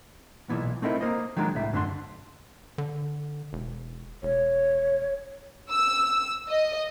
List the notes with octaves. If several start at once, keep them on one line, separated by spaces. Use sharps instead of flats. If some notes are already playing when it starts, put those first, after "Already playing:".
B1 G2 A#2 E3 B3
A3 C4 D#4 E4 A#4
A#3 A#4 C5 D#5
D#3 F3 F#3 G#3 D4 A#4
C2 A2 E5
F#2 D3 A3 D4 C6
D3
E1
E1 C#5
E6
D#5